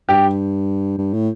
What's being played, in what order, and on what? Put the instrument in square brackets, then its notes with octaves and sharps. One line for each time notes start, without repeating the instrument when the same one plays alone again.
[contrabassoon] G2 [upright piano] G4
[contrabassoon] G2
A2